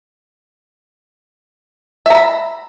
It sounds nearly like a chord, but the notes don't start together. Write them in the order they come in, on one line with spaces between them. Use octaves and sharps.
E5 A#5 B5